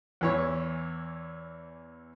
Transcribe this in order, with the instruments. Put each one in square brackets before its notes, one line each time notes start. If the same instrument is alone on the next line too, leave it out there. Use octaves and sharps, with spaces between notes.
[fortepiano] E2 E3 C#5